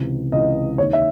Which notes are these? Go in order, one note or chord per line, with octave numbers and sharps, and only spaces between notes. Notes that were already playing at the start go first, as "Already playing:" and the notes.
Already playing: C#2 C3 E3
C#2 C3 E3 D#5
D#2 D#3 C#5
E5